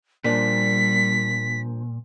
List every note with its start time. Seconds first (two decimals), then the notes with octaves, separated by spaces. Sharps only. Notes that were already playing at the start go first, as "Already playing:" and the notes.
0.24 A#2 F3 G3 A#3 D4 B6